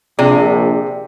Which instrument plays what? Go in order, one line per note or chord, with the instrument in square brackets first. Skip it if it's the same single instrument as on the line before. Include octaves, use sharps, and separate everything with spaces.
[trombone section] A#1 [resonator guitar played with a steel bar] C3 [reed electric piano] G#4 D5